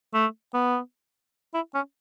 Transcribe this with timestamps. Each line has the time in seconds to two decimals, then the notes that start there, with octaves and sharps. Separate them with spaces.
0.14 A3
0.54 B3
1.54 E4
1.74 C#4